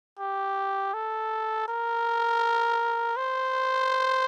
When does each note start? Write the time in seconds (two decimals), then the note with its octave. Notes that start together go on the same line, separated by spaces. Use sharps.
0.19 G4
0.94 A4
1.68 A#4
3.16 C5